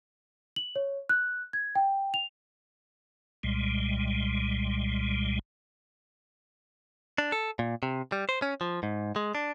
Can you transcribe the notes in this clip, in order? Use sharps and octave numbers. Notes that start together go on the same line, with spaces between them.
F#7
C#5
F#6
G#6
G5
F7
C2 A#2 G3 G#3
D4
A4
A#2
C3
G3
C5
C#4
F3
G#2
G#3
D4